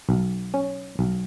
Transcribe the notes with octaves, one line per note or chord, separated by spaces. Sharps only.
B1
C#4
B1